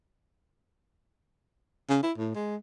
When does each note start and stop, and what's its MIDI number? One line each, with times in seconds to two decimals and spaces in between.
1.89 1.98 49
2.03 2.12 64
2.18 2.30 45
2.35 2.56 56